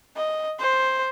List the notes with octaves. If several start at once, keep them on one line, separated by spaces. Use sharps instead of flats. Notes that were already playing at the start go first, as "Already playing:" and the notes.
D#5
C5